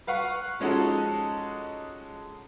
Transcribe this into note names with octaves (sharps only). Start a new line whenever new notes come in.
B4 F5 F#5 C#6
F3 G#3 C#4 D#4 F#4 A4